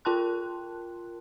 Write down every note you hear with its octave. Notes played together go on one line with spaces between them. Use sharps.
F4 A#4 G5 A5 C6 F#6